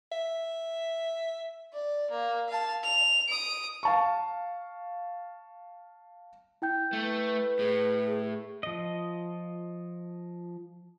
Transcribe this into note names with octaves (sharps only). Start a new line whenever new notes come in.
E5
D5
A#3
F5 A5
F7
D#6 D7
F5 A5 C#6
E4 G5 G6
A3 B4
A2 G#4
F3 D#5